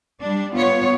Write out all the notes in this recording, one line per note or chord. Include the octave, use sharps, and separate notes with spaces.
G3 D4
B3 F4 C#5